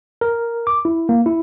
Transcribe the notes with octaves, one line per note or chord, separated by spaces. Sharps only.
A#4
D6
E4
A#3
E4